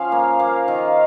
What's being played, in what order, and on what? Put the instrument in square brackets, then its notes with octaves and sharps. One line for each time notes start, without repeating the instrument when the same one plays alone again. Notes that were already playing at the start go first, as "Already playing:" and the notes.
Already playing: [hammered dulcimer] F3 C#4 [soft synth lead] F5
[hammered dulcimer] A#3
A#3
D#3